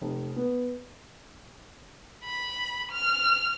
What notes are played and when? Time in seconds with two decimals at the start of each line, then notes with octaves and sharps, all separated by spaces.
0.01 F1
0.36 B3
2.25 B5
2.92 F6